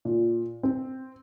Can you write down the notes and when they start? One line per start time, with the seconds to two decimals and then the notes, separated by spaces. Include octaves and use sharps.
0.05 A#2
0.63 C4